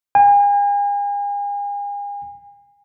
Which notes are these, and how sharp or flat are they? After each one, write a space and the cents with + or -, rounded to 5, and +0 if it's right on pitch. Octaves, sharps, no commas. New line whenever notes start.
G#5 -40